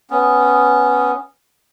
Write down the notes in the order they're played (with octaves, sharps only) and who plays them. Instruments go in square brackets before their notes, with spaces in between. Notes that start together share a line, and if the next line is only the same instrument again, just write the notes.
[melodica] B3 C#4